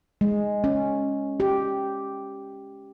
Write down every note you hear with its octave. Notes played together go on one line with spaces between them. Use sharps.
G#3
C#4
G4